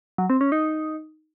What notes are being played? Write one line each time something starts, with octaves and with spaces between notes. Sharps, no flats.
F#3
C4
C#4
D#4